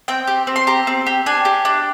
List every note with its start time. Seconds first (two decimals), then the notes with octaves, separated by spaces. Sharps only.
0.08 C4 G5
0.27 G4
0.47 C4
0.56 C6
0.67 G4 A#5
0.87 C4
1.07 G4
1.26 D4 G#5
1.45 G4
1.65 D4